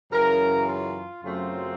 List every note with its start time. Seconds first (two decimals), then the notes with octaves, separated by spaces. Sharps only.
0.11 F#2 C#3 E3 A#4
0.68 F4
1.23 F#2 C#3 F#3 A3 C4 F4